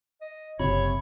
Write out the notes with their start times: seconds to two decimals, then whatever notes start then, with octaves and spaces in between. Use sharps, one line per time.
0.21 D#5
0.59 F#1 C3 C#5 B5